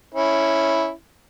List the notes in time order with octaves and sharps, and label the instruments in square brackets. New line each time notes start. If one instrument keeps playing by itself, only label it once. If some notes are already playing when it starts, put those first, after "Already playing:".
[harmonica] C#4 E4